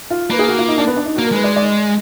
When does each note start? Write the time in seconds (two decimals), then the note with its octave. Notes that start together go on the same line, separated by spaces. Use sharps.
0.10 F4
0.30 A#3 B4
0.39 G#4
0.48 F#4
0.58 F4
0.68 D#4
0.78 D4
0.87 B3
0.97 D4
1.06 D#4
1.16 A#3 F#4
1.25 A#4
1.32 G#3 B4
1.44 D5
1.56 D5
1.62 D#5